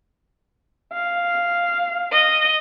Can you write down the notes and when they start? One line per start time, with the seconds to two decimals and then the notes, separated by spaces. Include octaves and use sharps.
0.93 F5
2.11 D#5